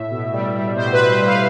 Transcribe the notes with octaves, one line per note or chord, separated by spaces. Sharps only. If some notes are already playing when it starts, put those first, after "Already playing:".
Already playing: A2 E5
B2
G3
G3
B2 C5
B4
B2
C5
G3
F5